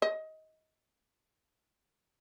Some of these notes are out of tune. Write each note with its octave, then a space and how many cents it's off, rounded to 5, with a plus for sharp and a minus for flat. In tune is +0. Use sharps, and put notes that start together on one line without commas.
D#5 +20